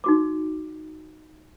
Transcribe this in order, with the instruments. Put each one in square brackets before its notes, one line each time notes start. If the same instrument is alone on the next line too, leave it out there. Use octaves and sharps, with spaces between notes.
[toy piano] D#4 F#4 D6